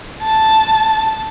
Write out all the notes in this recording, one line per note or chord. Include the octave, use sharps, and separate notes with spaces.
A5